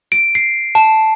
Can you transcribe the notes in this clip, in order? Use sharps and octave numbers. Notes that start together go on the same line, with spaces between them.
D7
C7
A5